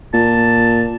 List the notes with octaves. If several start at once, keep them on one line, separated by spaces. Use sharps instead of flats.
A#2 A5